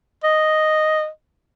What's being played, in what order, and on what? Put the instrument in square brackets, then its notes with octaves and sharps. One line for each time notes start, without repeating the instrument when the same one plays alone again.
[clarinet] D#5